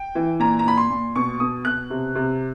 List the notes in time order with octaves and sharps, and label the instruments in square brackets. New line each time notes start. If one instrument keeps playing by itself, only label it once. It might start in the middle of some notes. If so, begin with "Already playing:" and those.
Already playing: [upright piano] G5
E3
A#2 A#5
A#5
A#2 B5
C6
A#2
B2 C#6
B2 D#6
B2 F#6
C3
C3